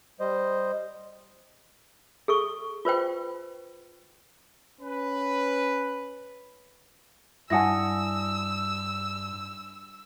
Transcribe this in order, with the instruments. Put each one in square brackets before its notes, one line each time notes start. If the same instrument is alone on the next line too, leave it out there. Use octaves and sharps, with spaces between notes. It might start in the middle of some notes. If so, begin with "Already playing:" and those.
[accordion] G3 C5 D#5
[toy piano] G#4 A4 C#6
F4 B4 C5 G5
[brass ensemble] C#4 B4
[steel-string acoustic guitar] G2 [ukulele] E4 F#5 G#5 [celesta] A5 D#6 A#6 [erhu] E6